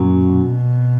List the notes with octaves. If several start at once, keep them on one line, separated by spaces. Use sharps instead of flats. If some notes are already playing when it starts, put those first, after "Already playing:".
Already playing: F#2 A#2
B2